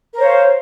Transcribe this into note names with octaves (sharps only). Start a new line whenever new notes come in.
A#4 C5 C#5 F5